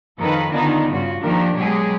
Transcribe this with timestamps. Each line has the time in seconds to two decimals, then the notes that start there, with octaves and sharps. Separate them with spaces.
0.19 F2 D#3 A4 B4 F5
0.51 D3 D#3 B3 D4 D#4 F4
0.91 G2 C#3 F4 F#4
1.22 D#3 F3 A#3 D4 G4 A#4
1.56 B2 F#3 G#3 G4 G#4